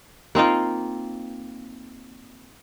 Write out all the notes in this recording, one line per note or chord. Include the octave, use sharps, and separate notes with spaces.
A#3 C4 D#4 F4